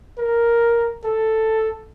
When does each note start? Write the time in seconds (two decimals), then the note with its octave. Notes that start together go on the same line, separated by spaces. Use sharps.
0.18 A#4
1.04 A4